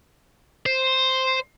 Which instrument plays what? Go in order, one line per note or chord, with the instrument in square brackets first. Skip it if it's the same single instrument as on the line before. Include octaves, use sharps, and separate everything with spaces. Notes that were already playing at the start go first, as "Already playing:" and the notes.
[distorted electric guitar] C5